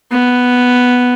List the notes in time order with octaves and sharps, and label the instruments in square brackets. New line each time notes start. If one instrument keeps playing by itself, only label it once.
[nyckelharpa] B3